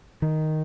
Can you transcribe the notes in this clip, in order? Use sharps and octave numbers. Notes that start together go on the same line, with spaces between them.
D#3